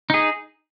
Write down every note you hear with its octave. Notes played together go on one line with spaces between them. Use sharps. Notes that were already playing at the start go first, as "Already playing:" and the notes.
D#4 G#4